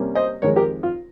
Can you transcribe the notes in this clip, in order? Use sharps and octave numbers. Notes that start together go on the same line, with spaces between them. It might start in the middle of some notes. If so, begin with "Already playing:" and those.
Already playing: C3 G3 A#3 C#4
C5 D#5
F2 D#3 G#3 A#4 C#5
G4 A#4
F4